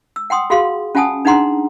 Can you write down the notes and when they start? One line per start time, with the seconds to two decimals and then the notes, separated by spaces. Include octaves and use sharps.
0.16 E6
0.30 F#5 G5 C6 D#6
0.50 F4 F#4 G#4 F5 C6
0.95 C#4 F4 F#5 G#5 A5 D#6
1.25 D4 D#4 G#4 F#5 A#5 C6